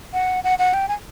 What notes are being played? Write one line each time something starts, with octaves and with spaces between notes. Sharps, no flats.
F#5
F#5
F#5
G5
G#5